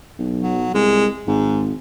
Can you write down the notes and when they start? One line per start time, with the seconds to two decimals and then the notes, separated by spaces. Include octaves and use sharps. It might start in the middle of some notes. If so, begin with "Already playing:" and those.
0.19 B1
0.41 F#3
0.74 C2 G#3
1.27 G#1 G#2